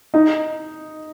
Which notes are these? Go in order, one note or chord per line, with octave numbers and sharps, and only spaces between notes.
D#4